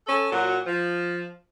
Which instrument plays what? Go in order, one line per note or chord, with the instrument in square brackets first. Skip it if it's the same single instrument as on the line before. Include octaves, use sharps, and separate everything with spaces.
[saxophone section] C#4 A4
A#2 F#3 F#4
F3